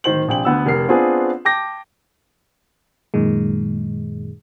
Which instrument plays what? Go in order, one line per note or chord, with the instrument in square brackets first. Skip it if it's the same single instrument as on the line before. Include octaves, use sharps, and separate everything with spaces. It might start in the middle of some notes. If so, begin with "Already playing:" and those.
[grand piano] D1 D#3 C5 F#7
A#1 C3 G5 F#7
D2 B3 E6
F1 A#4 F6 C7
B3 C4 D4 F4 G#4 B4
G5 A5 D6 G6 A#6
[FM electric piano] F#2 A#2 D#3 G#3